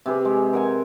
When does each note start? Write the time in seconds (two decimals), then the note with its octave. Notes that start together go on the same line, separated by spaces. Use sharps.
0.06 C3 G4 G#4 B4
0.25 G#3
0.53 A#4 F#5 G#5